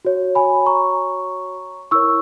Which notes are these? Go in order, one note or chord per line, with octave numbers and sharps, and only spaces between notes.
F#4 C#5
G#5 B5
A#5 C#6
E4 A#4 C#5 C#6 E6